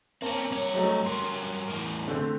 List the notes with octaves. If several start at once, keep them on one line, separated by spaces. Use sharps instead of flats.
A#3 C4 C#4 A5
G2 C#5
F#3 A3 D#5
G2 F#3 A#4 C6
E2 A2 A#4
D3 A3 C4